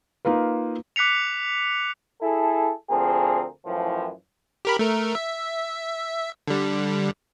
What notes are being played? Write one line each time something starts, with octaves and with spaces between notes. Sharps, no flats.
A#3 D#4 F4 B4
D6 F#6 B6 C#7 F7
E4 G#4 A4
D2 F3 C4 G#4 A#4
F#2 A2 E3 F3
G4 A#4 B5
A3 A#4
E5
D3 G3